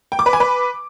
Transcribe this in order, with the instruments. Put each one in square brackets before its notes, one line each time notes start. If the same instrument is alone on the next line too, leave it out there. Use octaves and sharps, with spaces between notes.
[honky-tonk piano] G5
D6
B4
G#5
B4